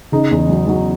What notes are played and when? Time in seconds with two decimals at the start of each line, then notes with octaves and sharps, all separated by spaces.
0.12 C#3 D#4
0.31 E2
0.49 F#3
0.68 F#3